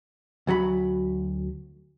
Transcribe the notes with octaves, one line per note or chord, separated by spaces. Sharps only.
D2 F#3 F#4 B5